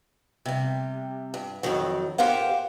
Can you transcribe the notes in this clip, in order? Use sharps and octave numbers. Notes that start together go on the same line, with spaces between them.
C3 G3
G2
F2 A2 D#3 F#3
G4 A#4 C5 F5 F#5